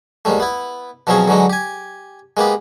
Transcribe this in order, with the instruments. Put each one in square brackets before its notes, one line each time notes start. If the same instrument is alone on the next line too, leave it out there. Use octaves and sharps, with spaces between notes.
[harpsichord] D#2 G#2 G3 A3
B3 E4
B2 F3 F#3 C4 C#4 G#4
D3 E3 F#3 G#3 D#4
G4 G#5
G#3 A#3 B3 G4